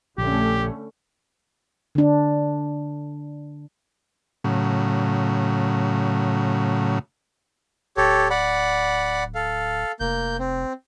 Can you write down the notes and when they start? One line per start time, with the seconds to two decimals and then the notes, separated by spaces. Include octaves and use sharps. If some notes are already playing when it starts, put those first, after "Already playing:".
0.18 A#1 D3 A3 C#4 G4
1.95 D3 D4
4.44 A2 C#3 F#3
7.97 D1 G4 A4 C#5
8.30 D5 F#5 B5
9.35 A4 F5
10.00 F1 A#3 G6
10.39 C4